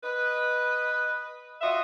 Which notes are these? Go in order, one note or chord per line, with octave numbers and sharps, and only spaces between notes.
B4 D#5
F4 F#4 D#5 E5